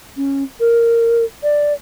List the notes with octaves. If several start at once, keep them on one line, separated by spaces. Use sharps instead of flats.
C#4
A#4
D5